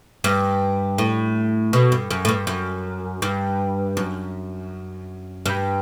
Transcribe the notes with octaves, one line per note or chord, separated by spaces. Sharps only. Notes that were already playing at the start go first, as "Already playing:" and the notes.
G2
A2
B2
G2
F#2
A2
G2
F#2
G2
F#2
G2